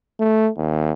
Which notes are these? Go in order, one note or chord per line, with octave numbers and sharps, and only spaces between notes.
A3
D#2